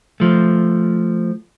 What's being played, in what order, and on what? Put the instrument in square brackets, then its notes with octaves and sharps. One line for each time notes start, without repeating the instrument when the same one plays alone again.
[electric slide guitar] F3 A3